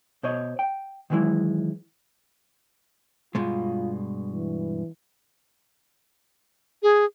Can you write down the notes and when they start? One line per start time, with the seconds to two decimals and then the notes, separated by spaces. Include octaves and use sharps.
0.23 B2 C5 C#5 D#5
0.59 G5
1.10 D#3 E3 F#3 G#3 E4
3.35 G2 B2 G#3 F4
4.32 E3
6.83 G#4